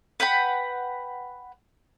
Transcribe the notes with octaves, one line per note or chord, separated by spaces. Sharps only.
B4 F#5 G5 B5